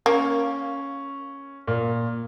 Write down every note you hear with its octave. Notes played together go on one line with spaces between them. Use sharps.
A#3 C#4
A#2